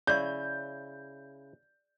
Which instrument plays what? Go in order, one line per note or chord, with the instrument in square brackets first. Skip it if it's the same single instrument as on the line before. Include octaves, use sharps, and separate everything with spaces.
[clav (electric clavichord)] C#3 E4 [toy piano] G#4 D5 C#6 [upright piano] G6